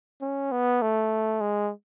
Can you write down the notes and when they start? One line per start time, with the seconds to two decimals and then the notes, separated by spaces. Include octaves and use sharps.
0.21 C#4
0.52 B3
0.82 A3
1.41 G#3